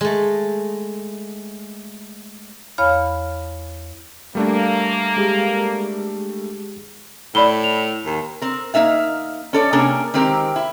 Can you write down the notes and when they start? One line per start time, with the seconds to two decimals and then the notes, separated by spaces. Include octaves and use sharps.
0.01 G#3 A3
2.78 E2 C#5 F5 G#5 B5 F6
4.35 G3 A3 A#3 D4
5.17 G#3 G4 G#4
7.35 A2 D5 B5 G7
7.64 F7
8.06 D#2
8.42 C4 A#4
8.74 A#3 D#4 E5 F5
9.53 C#4 A4 D5
9.73 C3 A#3 C#4 D4 G#4 A#4
10.14 D#3 G#3 C4 G4 A#4
10.56 E4